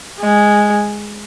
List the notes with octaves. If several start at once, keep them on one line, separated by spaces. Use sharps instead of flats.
G#3